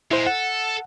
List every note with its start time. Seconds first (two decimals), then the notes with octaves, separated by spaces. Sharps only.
0.11 A#2 G#3 E4 C5
0.27 A4 F#5